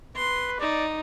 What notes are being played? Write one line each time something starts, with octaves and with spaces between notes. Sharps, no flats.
B4 C6
D#4 D5